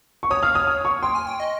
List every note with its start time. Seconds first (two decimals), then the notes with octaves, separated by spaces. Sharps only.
0.23 C#6
0.30 C#5 D#6
0.43 F5 F6
0.55 C#5 D#6
0.67 D#6
0.85 C#6
1.02 G5 C6
1.15 G#5
1.27 G5
1.40 D#5